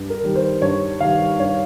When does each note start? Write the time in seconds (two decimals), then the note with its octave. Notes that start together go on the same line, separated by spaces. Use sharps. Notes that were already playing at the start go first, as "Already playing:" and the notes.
Already playing: G2
0.10 A#4
0.23 D#3 G3
0.36 C5
0.62 G2 C#5
1.00 D#3 G3 F5
1.39 G2 C#5